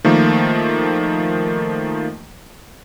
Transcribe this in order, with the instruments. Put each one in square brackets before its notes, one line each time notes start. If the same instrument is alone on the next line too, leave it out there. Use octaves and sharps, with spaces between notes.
[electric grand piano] D#3 F3 A3 A#3